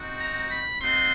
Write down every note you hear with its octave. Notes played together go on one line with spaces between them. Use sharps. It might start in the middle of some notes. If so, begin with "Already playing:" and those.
Already playing: C4 D#4 F#4
A#5
B5
A3 C4 D#4 F#4 C6